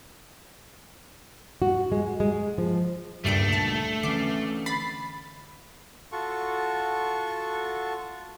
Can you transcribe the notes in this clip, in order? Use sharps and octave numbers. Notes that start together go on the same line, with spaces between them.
F#4
G#3
G#3
F3
C#2 G2 A#2 D3 A3 C7 D7
A5
D3 E3 C#4 D6 C7
B5 A6 C7
F4 F#4 A4 C#6